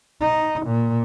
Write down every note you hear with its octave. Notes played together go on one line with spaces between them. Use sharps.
D#4
A#2